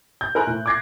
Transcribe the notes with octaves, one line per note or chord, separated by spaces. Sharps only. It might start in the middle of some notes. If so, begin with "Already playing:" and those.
G6
A#4 C5 G#5 A#5 F#6
A2
D6 F#6 G#6 A#6 C7